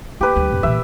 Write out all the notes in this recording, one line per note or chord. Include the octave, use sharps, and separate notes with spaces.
A#3 G4 B4
D2 G3
F2 A2
A#2 E3 E5